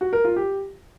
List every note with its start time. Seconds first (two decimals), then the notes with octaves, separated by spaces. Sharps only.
0.01 F#4
0.13 A#4
0.25 F4
0.36 G4